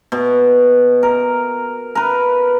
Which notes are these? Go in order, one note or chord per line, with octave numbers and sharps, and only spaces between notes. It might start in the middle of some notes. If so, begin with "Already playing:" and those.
B2
A#4
A#4 B4